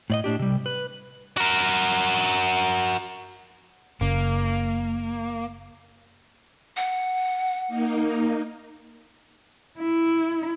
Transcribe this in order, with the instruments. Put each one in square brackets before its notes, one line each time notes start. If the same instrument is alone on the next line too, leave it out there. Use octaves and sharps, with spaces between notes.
[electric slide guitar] A2 D5 D#5
A2 D4 G4
C3 G3
B4
[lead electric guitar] F#4 A#4
[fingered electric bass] F#1 C#3 [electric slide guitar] A#3
[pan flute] F#5
[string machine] A#3 D#4
[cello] E4